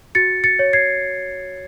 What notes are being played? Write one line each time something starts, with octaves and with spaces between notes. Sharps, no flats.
F#4 A6 C#7
A6 C#7
C#5
G#6 C7